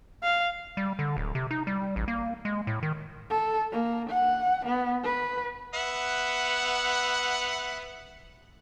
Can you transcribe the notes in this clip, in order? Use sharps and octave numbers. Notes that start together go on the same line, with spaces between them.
F5
G3
D3
D1
C3
D#4
G3
A1
A#3
G#3
A2
D#3
A4
A#3
F#5
B3
B4
B3 E5 F#5